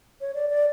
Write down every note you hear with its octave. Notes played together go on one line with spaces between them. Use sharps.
C#5
D5
D5